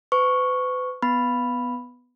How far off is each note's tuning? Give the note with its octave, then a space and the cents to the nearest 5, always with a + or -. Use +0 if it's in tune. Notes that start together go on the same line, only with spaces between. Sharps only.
B4 +40 C#6 +0
B3 +5 B5 +0